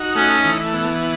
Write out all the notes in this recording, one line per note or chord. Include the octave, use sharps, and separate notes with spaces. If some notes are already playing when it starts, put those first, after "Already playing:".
Already playing: D#4 F#4
A3 C#4
E3
B3